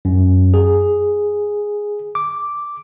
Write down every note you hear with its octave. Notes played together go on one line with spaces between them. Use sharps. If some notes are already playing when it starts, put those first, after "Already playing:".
F#2
G#4
D6